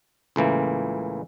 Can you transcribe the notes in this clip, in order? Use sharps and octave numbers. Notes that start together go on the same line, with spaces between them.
C#2 A2 E3 A#3